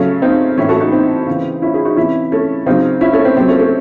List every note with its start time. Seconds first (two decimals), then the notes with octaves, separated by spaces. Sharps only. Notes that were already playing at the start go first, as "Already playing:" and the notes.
Already playing: C#3 F#3 A3 C#4
0.22 C4 D#4
0.58 A2 E3 C#4 E4
0.69 F#4 A4
0.80 D#4 F#4
0.92 C4 D#4
1.27 C#3 E3
1.62 C#4 E4
1.74 E4 G#4
1.85 D#4 F#4
1.96 C3 E3 C#4 E4
2.32 A3 C#4
2.66 C#3 F#3 C4 D#4
3.01 C#4 E4
3.13 A3 C#4
3.25 C4
3.36 C3 C4
3.40 F#3
3.48 A3 C#4
3.59 A3 C#4